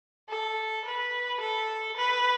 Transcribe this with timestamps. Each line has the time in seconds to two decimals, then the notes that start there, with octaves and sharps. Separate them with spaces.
0.29 A4
0.85 B4
1.40 A4
1.96 B4